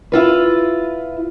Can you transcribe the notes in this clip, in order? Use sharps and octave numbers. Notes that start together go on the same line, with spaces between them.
E4 F4 B4